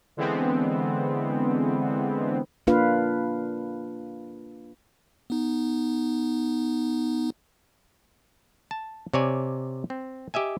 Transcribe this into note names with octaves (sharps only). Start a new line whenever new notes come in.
D3 E3 G#3 B3 C4
A#3 D4 F4 B4 F5
B3 D#4
A5
C3 C#5 D5 G#5
C4
G4 D#5 E5 G#5